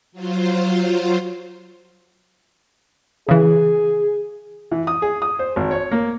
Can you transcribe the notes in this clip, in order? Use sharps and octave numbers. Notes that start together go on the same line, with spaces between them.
F#3 F4 C5
C#3 E3 G#4
E3
D#6
G#4
D#6
C5
G#1
C#5
A#3